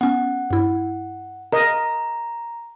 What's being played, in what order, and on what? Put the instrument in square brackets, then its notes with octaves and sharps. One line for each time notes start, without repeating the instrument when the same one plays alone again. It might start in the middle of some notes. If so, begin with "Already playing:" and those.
[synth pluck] B3 C#4 [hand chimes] F#5
[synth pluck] G2 E4
[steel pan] A#4 D#5 [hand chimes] A#5